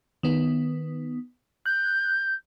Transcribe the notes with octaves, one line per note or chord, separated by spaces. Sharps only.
D#3 B3
F#6 G6